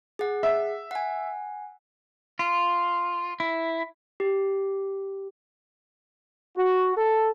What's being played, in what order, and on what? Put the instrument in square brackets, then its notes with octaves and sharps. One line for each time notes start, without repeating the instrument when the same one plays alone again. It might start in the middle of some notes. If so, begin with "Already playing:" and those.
[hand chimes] G#4 F#5
[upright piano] E5
[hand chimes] F#5 G#5
[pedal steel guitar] F4
E4
[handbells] G4
[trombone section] F#4
A4